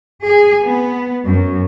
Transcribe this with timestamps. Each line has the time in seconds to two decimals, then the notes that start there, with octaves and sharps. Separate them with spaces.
0.25 G#4
0.65 B3
1.27 F#2